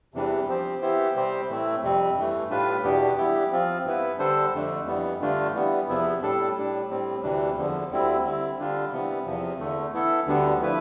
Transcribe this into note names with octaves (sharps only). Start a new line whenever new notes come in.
E2 C3 E3 G3 D4
F3 C4 G4 C5
E3 B3 E4 G4 C5
C3 G3 C4 G4 C5
A2 E3 A3 C4 E4
F2 C3 G3 C4
G2 E3 A3
A2 G3 D4 F4 B4
E2 B2 B3 D4 G4
E3 G3 B3 E4 G4
F3 C4 F4
G2 E3 B3 E4 B4
D3 G3 D4 A4 C5
F2 D3 A3 D4
F2 E3 G3 B3
G2 D3 A3 D4 F4
E3 G3 B3
E2 C3 F3 B3 E4
A2 G3 D4 A4
A2 G3 D4
A2 G3 C4
D2 C3 E3 G3 D4
E2 D3 F3
D2 D3 G3 C4 E4
D3 G3 C4 E4
D3 G3 D4 F4
C3 E3 G3 B3
E2 C3 F3
E2 D3 A3
E3 B3 E4 A4
D2 D3 G3 B3 D4
F3 A3 E4 B4